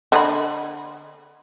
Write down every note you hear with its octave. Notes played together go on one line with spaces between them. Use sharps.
D3 D#5 B5